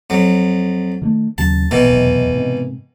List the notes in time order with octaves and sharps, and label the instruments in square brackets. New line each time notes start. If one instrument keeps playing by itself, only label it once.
[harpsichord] F2 F#3
[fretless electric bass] D#3 E3 A3
[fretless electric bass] D#2 C#3 F#3 [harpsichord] A5
[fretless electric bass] A#1 [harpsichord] B2 D#3 E3
[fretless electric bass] F1 B1 E2
G#2 C3